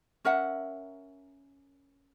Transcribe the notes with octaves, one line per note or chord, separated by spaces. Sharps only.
C#4 A#4 E5 F#5